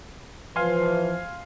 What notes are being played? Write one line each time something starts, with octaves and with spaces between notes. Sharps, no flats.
E3 F3 F5 G#5 C6